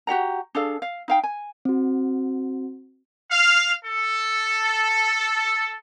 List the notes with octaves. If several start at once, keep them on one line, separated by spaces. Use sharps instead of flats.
F#4 G4 F#5 A#5
D4 G#4 A4 F5
F5
D#4 F5 G5
G#5
C4 F#4
F5
A4